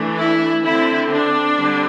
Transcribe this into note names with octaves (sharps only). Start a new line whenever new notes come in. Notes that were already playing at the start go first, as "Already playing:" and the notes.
Already playing: E3 A3 D4
E4
D3 C4 E4
D4
D3 G3 C4